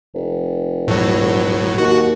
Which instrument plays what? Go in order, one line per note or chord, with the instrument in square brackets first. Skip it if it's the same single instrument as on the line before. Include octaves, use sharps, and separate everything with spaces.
[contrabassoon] F1
[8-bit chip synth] A2 F#3
[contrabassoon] D#2 [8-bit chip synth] F#4